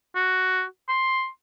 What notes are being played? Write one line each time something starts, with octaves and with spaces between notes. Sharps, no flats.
F#4
C6